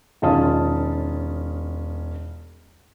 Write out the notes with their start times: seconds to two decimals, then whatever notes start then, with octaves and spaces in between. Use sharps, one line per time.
0.22 E1 D#3 C#4 F4 A5 D#6